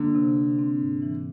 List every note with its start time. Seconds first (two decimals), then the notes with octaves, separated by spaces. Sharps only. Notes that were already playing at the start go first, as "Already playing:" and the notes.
Already playing: D3 A#3
0.15 C3
0.37 C3
0.59 C4
0.80 G#2
1.02 E3